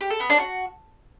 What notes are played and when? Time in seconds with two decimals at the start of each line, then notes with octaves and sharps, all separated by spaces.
0.01 G4
0.10 A4
0.20 B3
0.30 D4
0.39 F#4